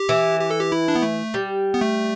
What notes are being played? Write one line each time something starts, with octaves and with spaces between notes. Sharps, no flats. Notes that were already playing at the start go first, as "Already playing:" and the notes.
Already playing: G4
E3
G4
A4
G4
E4
D4
B3
A3
G3
B3
A3